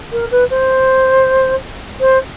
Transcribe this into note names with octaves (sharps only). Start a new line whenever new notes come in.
A#4
B4
C5
C5